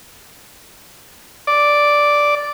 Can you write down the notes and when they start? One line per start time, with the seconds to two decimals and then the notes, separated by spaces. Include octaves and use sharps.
1.47 D5